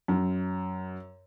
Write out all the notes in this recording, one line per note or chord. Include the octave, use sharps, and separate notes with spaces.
F#2